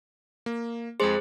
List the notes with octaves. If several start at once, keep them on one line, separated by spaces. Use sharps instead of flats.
A#3
F2 G#3 G#4 C5 C6